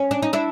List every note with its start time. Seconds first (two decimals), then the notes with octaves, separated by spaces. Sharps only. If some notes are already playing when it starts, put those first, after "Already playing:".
Already playing: C#4
0.11 D4
0.22 D#4
0.33 D4 E4